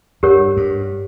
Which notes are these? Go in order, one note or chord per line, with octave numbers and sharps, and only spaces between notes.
G2 G4 A#4 C#5 F#5
G2